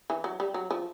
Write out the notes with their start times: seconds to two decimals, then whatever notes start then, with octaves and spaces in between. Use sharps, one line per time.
0.10 E3
0.24 F#3
0.40 G3
0.54 F#3
0.71 F3